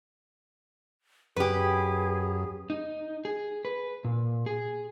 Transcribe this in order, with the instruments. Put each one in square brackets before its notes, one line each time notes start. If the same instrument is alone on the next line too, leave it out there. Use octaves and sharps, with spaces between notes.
[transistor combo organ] F#2 [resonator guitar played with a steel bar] G4 B4 [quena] G#4
[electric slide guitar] D#4
G#4
B4
A#2
G#4